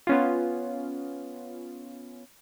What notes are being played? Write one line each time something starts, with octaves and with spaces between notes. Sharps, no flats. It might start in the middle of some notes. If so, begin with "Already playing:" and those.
B3 C#4 F4